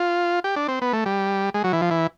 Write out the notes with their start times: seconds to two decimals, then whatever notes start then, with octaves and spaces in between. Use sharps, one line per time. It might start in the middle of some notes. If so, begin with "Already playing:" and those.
Already playing: F4
0.44 G4
0.56 D4
0.68 C4
0.82 B3
0.93 A3
1.06 G3
1.54 G#3
1.64 F#3
1.73 E3
1.82 F3
1.90 E3